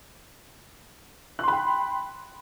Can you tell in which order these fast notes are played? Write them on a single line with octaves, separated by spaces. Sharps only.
F#6 C6 B5 G5